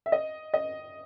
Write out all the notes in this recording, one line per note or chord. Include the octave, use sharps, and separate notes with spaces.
E5
D#5
D#5